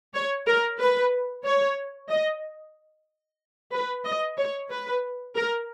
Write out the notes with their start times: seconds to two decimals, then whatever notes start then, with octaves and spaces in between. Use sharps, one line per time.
0.14 C#5
0.47 A#4
0.79 B4
1.44 C#5
2.09 D#5
3.73 B4
4.05 D#5
4.37 C#5
4.70 B4
5.35 A#4